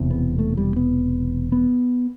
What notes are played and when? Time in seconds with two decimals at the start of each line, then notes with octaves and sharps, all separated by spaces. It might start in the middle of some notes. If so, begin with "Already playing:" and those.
Already playing: E1 E2 C3
0.10 B3
0.39 A3
0.57 G3
0.76 B3
1.52 B3